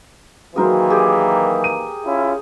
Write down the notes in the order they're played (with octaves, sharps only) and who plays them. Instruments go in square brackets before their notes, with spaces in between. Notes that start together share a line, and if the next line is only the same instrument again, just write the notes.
[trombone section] D#3 E3 A#3 [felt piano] F#3 F#4 [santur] G#4 A#4 C5
[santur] G4 G#4
[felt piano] D#7
[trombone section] C#4 E4 F4